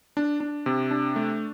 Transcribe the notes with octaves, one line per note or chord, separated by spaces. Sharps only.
D4
D4
C3
D4
A3